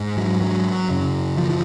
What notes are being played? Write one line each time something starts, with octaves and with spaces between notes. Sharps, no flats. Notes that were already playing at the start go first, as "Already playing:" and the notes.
Already playing: G#2
F#3
F#3
F#2 C#3
F3
F3